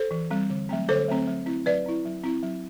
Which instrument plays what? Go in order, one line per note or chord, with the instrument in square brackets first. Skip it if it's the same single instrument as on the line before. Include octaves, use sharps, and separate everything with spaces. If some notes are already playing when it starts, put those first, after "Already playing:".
Already playing: [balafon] A4 C5
E3
G3 C4
D3
F#3 A3 C4
D3 A4 C5
F#3 A3 C4
F#3
C4 E4
F#3 B4 D5
C4 E4
F#3
C4 E4
F#3